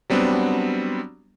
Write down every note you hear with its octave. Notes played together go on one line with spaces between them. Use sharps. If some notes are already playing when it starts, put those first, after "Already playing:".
F#3 G3 B3 C4 D4